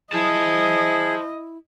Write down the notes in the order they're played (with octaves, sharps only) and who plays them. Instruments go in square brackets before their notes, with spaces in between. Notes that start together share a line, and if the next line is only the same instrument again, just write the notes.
[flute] E4 [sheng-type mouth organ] G#4 [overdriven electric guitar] C5 A5 [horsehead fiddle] D#5